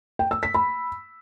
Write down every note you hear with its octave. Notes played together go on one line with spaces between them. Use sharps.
G5
E6
B6
B5